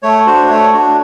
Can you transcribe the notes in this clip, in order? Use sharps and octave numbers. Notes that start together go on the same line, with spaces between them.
A3 C#5
D4 F#4 C5
A3 C#5
D4 F#4